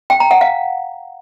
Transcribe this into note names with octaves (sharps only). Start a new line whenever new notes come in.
G5
A#5
F#5
F5